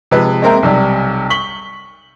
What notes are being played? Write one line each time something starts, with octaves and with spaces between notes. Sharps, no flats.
C3 F3 G#3 B4
G#3 A#3 C4 A#4 E5 G5
B1 C3 G3
C#6 B6 F#7 G7